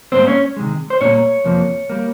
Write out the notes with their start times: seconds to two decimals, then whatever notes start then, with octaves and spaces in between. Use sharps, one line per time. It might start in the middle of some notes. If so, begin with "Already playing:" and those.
0.12 G#2 G3 A#3 C4 C5
0.27 C#4 C#5
0.57 C3 D#3 G#3
0.90 C5
1.01 A#2 G3 A#3 C#4 C#5
1.44 F2 C3 F3 A#3
1.90 G3 A#3